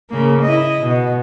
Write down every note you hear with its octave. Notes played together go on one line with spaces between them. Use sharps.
C#3 A#3
E4 D#5
B2